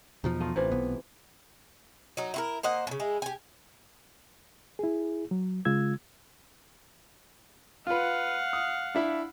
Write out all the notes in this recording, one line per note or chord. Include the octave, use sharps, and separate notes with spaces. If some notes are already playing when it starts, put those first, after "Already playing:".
E2 B2 F3 D#4
A3 F4 D#5
A1 C3 E3 F4
B1 B3
F#3 D#4
E4 F#4 A#4
A#3 C5 D#5 F#5
A2 C#3
G#3 E4 G#4
G4 G#5
E4 G#4
F#3
C#3 G#3 F4 E6 G#6
F4 B4 F5 F#5
D#6
D4 E4 B5